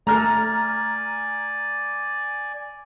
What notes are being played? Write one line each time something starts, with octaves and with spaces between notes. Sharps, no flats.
A3 A4 D5 G#5 A#5 F6